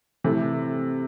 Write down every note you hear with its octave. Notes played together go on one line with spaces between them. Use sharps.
C3 E3 A3